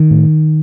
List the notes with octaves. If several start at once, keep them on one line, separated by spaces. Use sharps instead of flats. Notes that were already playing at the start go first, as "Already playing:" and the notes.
Already playing: D#3
A2